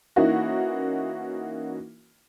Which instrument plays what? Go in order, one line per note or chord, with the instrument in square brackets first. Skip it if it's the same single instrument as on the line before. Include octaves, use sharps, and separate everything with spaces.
[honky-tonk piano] E3 A#3 C#4 D#4 E4 F#4